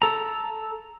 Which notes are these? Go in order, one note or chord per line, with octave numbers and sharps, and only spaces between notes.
A4 A#5